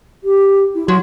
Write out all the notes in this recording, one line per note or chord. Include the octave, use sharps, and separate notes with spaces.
G4
E4
F#3 C6